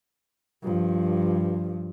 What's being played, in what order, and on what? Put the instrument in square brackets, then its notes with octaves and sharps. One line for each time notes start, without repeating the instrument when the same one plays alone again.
[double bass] G2 F3